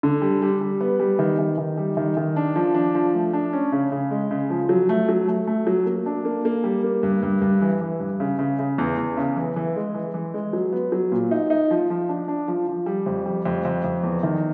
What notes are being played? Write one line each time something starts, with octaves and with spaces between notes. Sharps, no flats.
D3
G3
G3
G3
B3
G3
D#3
D#3
D#3
G3
D#3
D#3
D4
F3
D4
F3
A3
D4
C#4
C#3
C#3
G#3
C#3
F3
F#3
A3
F#3
A3
A3
F#3
A#3
D4
A#3
A#3
G3
A#3
G2
G2
G2
E3
E3
G2
C#3
C#3
C#3
E2
E2
C#3
E3
E3
G#3
E3
E3
G#3
F#3
B3
F#3
A#2
D#4
D#4
F3
F3
D4
D4
F3
F3
G3
F2
G3
F2
F2
F2
E2
D#3